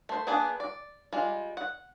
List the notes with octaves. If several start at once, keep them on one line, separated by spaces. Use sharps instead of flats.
A3 C5
A#3 B3 D4 G#4
D5
G3 G#3 F4
F#5